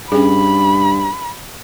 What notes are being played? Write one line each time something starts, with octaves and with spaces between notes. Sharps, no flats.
G2 C#4 G#4 B5